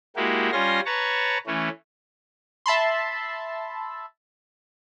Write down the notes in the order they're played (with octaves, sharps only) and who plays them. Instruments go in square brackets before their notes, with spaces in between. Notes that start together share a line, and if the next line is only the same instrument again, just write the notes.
[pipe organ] G#3 A#3 E4 F#4 G4
G3 C#4 F4 G#5 C6 A#6
B4 C#5 A5 A#5 C#6
E3 A3 C#4
[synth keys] E5 A5 B5 C6